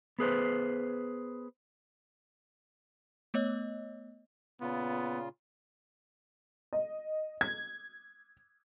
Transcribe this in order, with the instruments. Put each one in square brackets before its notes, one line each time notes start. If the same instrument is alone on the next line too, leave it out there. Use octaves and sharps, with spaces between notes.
[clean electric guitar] B3 G#4 B4 C5
[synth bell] A3 B3 C#5 D#5
[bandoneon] A#2 C#3 F4 [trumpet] B3
[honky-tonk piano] D#5
G#6